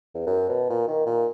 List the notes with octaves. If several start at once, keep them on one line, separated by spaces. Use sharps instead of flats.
E2
F#2
B2
A#2
D#3
A#2